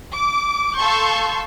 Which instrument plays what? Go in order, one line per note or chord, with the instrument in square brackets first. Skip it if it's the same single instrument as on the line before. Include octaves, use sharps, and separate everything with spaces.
[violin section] D6
A4 F5 A5 C6 C#6 G6